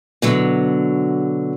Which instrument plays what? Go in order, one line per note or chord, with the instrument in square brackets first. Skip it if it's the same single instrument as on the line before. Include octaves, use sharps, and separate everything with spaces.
[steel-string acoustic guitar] B2 D3 F#3